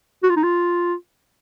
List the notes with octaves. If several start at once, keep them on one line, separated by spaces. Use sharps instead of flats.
F#4
F4
D#4
F4